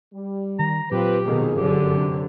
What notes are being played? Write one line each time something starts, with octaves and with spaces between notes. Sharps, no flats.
G3
D#3 A#5
A#2 F#3 C4 F4 G4 B4
F2 B2 D#3 G#4
G1 F#2 D3 G4
C3